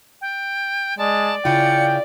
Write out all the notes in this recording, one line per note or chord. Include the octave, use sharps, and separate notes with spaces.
G5
G#3 D5 A5
C#3 E4 F4 G5 C#7